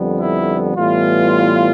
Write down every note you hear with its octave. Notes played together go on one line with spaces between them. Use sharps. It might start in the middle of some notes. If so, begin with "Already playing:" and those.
Already playing: F2 D3 G3 B3
E4
A2 E3 G3 B3 F4